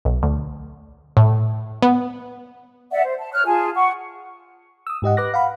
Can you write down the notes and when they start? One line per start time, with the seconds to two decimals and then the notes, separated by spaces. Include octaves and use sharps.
0.05 B1
0.23 D2
1.17 A2
1.82 B3
2.91 D5 E5 F#5
3.04 C5
3.18 A5
3.33 C#5 F6 F#6
3.45 F4 G#4 G#5 A5
3.74 F#5 C#6
4.87 D#6 E6
5.02 G#2 G4 D#5 F#5
5.17 B4 D6 F#6 A#6
5.34 F5 F#5 B5